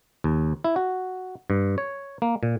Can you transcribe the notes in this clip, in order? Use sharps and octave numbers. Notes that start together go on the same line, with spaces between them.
D#2
E4
F#4
G2
C#5
A#3
A#2